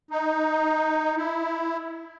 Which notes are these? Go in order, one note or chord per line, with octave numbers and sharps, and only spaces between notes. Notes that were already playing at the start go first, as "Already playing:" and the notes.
D#4
E4